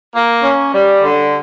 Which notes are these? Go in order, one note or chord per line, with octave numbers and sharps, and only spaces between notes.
A#3
C#4
G3
D3